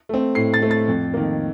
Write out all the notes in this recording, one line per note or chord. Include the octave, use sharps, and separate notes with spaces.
A3 C4
A2 C7
A6
A3 C4
A6
F2
D#3 A#3